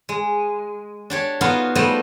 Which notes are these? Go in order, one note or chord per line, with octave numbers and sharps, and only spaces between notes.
G#3
D4 G4 C#5
B3 D#4 F4 F#4 F5 F#5
G3 A3 B3 C5 D5 D#5